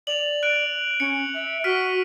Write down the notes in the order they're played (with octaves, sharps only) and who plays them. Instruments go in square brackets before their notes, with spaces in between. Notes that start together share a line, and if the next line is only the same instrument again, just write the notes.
[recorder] D5 [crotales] F7 F#7
[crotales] F#6 D7
[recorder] C#4 [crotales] C#7
[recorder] E5
[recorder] F#4 [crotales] F6 B6 D#7